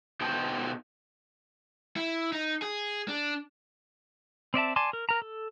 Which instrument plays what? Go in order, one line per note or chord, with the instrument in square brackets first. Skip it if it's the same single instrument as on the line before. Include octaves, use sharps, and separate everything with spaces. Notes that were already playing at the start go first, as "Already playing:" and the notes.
[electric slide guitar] B2 D#4 C5 G5 A5
[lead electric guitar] E4
D#4
G#4
D4
[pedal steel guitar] C4 D5 E5 A5
D5 G#5 A5 C6 D6
A#4
A#4 A#5
A4